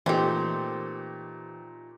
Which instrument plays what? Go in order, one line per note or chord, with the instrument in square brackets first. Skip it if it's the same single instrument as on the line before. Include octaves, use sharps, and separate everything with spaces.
[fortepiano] A#2 A3 D#4 [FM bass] E3 [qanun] C4 G4